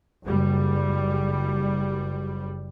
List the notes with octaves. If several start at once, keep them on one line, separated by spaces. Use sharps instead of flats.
F#1 G3